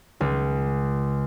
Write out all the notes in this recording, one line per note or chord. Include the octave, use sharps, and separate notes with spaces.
C#2